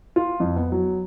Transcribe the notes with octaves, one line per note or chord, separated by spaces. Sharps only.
F4
F2
B3
F#3